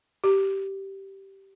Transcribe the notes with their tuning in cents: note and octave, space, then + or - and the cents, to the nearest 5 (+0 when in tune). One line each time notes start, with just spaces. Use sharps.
G4 -10